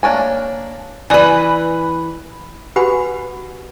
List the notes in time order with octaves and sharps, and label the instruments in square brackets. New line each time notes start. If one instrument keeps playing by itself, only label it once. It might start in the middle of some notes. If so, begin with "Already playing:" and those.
[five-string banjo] A#3 D4 C#5 G#5
[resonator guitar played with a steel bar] E3 B4 [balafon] D5 G#5
[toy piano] F#4 G4 B4 F#5 G#5 B5